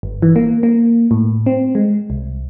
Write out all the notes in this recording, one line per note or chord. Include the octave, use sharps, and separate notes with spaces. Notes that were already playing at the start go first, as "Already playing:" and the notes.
G1
E3
A#3
A#3
A2
C4
G#3
C2